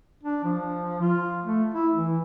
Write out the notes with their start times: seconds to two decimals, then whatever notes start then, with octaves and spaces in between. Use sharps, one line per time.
0.24 D4
0.44 F3
1.02 F4
1.44 A3
1.74 E4
1.94 E3